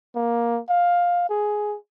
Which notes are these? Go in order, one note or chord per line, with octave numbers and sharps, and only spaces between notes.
A#3
F5
G#4